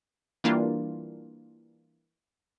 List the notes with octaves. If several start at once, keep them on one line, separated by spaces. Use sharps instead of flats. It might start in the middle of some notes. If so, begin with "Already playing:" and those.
E3 G3 A#3 D4 F4